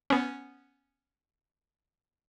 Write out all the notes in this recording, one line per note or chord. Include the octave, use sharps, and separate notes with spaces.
B3 C#4